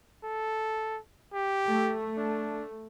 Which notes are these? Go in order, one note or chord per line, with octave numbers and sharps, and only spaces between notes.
A4
G4
A3
D4